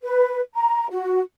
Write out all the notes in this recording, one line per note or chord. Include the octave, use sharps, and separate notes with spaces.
B4
A#5
F#4